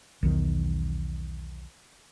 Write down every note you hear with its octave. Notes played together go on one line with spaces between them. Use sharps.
B1 E2 D#3